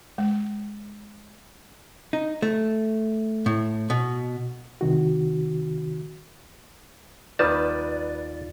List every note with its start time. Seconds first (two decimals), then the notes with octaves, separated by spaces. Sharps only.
0.18 G#3
2.13 D#4
2.42 A3
3.46 A2
3.90 B2
4.81 C2 C3 D#3 F#4
7.39 D#2 D#3 G3 D#4 F4 B4 D5 A5